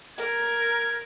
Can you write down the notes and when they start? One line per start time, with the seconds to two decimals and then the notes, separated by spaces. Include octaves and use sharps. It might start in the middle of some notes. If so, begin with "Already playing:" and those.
0.18 A#4 G#6